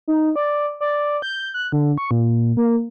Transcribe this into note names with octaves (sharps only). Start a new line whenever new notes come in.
D#4
D5
D5
G6
F#6
D3
C#6
A#2
A#3